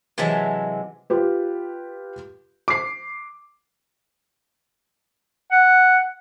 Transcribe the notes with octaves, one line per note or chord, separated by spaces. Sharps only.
C3 E3 F#3 G#3 E5 A5
F4 G4 B4
D6 C7
F#5